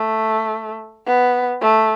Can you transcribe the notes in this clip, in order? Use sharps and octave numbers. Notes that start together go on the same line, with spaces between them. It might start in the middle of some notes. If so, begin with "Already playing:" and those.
Already playing: A3
B3
A3